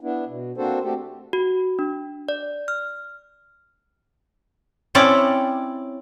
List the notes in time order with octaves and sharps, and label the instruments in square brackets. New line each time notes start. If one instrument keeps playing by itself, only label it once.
[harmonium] B3 D4 E4
B2
A#3 C4 D4 F#4 A4 C5
A3 C4 F#4 G4 A4
[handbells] F#4
D4
D5
F6
[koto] C4 C#4 E4 C#5 D5